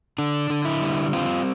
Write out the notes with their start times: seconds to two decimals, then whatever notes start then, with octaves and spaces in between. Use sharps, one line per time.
0.18 D3 D4
0.50 D3
0.65 E4
0.81 G3
1.13 C4 F4